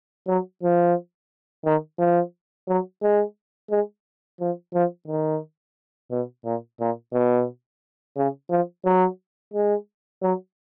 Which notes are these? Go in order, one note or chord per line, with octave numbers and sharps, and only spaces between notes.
F#3
F3
D#3
F3
F#3
G#3
G#3
F3
F3
D#3
B2
A#2
A#2
B2
C#3
F3
F#3
G#3
F#3